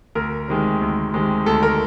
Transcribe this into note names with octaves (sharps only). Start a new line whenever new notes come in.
D2 A#4
C3 D#3 G#3
D2
C3 D#3 G#3
D2 A4
A#4